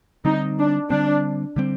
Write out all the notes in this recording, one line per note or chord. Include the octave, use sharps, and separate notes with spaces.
D3 G3 C4 D#4
D4
D3 G3 C4 D4
D3 G3 C4